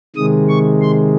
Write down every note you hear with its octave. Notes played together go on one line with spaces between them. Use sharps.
C3 D#3 G#3 D#6
C#6
C6